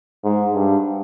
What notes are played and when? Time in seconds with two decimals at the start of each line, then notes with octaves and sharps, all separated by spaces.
0.24 G#2
0.54 G2